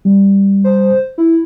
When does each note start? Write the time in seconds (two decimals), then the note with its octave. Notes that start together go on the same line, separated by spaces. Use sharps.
0.05 G3
0.64 C5
1.18 E4